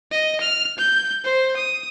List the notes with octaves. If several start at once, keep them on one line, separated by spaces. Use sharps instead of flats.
D#5
F6
G6
C5
D#6